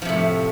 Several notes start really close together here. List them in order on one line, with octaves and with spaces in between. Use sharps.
F3 C3 A2